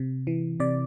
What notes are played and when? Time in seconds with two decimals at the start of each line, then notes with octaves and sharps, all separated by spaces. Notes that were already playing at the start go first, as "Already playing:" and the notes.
Already playing: C3
0.27 E3
0.60 C3 D5